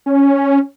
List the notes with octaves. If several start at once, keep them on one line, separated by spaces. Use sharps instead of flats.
C#4